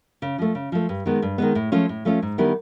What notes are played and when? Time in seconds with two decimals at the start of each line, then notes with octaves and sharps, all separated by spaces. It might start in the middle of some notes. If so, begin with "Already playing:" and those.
0.22 C#3
0.38 F3 A3
0.55 C#3
0.72 F3 A3
0.89 G2
1.06 D#3 G#3 B3
1.22 G2
1.38 D#3 G#3 B3
1.55 A2
1.72 F3 A3 C#4 F4
1.89 A2
2.05 F3 A3 C#4 F4
2.22 G#2
2.38 D#3 G3 B3 E4